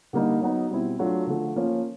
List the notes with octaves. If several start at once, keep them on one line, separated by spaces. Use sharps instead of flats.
D3 G3 A#3 D#4
F#3 B3 D#4
B2 G3 C4 E4
F#3 A3 D4 F4
D3 F3 A3
F3 A#3 C#4